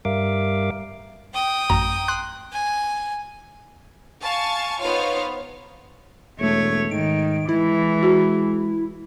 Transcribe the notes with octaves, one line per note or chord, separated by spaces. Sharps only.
G2 G3 A#4 E5 F5 D6
G5 D#6
A1 F#2 A#5
C6 F#6
G#5
F5 G#5 A5 C#6
B3 D#4 F4 C5 C#5 F5
E1 A3 C#5
G#2 D#3 D7
E3 G#3 E4
F#4